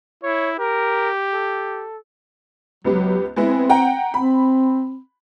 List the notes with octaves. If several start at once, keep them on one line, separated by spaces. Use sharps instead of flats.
E4 C#5
G4 A#4
A4
C#2 F#3 B3 G4
G#3 B3 C4 E4
F#5 G5 A#5
C4 B5